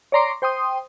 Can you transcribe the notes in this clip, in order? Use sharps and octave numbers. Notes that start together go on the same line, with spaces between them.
C#5 D5 A#5 C6 D6
C5 G5 C6 D#6